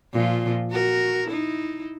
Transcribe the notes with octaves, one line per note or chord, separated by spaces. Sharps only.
A#2 F3 F4
F#4 A#4
D#4 E4